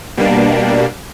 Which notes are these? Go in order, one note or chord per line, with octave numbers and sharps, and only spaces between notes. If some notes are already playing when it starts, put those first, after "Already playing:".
B2 G3 A#3 D4